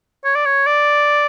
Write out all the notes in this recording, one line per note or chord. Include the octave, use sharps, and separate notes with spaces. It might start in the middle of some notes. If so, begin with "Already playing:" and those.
C#5
D5
C#5
D5